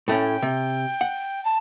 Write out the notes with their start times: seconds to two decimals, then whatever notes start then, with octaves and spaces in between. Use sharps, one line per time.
0.08 A2 A3 C#4 G5
0.42 C3
1.01 F#5
1.45 A5